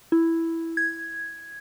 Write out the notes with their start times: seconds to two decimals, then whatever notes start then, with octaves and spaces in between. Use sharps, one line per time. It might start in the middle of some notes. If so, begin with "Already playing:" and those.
0.12 E4
0.77 G#6